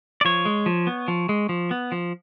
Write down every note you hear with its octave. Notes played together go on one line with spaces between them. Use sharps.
D5
F3 C#5
G#3
F3
B3
F3
G#3
F3
B3
F3